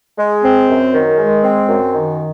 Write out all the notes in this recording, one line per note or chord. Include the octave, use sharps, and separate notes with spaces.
G#3
C4
F#2
D#3
G#3
C4
F#2
D#3